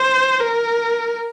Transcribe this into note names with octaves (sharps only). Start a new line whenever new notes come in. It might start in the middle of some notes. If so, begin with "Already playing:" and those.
Already playing: C5
A#4